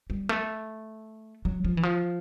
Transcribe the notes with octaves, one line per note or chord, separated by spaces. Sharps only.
G3
A3
F#3
F3
E3
F3